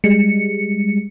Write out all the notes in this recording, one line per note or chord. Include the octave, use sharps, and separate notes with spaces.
G3 G#3 C#7